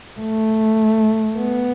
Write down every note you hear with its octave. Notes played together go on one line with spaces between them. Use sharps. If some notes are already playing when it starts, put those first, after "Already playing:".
A3
B3